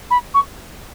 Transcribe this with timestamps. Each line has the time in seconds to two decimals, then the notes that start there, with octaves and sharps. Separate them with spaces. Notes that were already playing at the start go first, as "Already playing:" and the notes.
0.10 B5
0.34 C#6